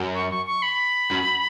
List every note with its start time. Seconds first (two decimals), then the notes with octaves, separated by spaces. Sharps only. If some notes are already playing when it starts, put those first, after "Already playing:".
Already playing: F#2
0.15 C#6
0.30 C#6
0.46 C#6
0.62 B5
1.11 F#2